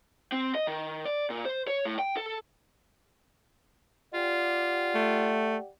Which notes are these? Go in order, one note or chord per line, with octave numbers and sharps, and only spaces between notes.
C4
D#5
D#3
D5
A#2
C5
C#5
A2
G5
A4
F4 G4 D5 F#5
A3